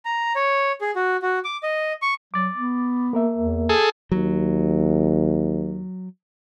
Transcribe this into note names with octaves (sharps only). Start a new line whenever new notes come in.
A#5
C#5
G#4
F#4
F#4
D6
D#5
C#6
F#3 D6 A6
B3
A#3 A#4 E5
E2
G#4 A4
D#2 F#3